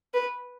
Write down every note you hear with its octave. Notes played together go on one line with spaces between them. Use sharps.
B4